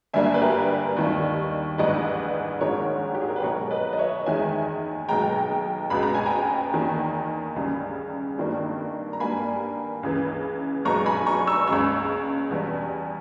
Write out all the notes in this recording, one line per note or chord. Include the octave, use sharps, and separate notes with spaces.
G1 G2 G3 A#3 E5 G#5
B4
G4 A#4
D#2 D#3 G3
A#1 G#2 E3 G3 B4 D#5
A#1 G#2 D#3 G#3 A#4 C#5
G4
G#4
A#4
B4
B1 B2 G#3 A#4 C#5
B4 D#5
D#5
C#5 E5
E2 D#3 G#3 E5 G#5
B1 B2 G#3 G5 A#5
C#2 B2 G#3 B5
A#5
G#5
G5 A#5
E2 D#3 A#3
C#2 C#3 G3
G#1 G2 D#3 G3 A#3
A#5
G2 G3 A#3 G#5 B5
C#2 C#3 E3
B1 B2 G#3 A#5 C#6
G#5 B5
A#5 C#6
C#6 E6
C#2 C#3 G#3 C#6 E6
E2 B2 G3